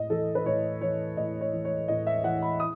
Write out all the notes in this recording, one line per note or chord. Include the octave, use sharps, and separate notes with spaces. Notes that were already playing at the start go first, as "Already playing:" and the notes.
Already playing: A2 D#5
E3 A4
B4
A2 C#5
E3 C#5
A2 D#5
C#5
E3
C#5
A2 D#5
E5
E3 F#5
B5
D#6